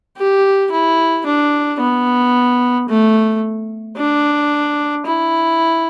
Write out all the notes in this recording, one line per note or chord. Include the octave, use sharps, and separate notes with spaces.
G4
E4
D4
B3
A3
D4
E4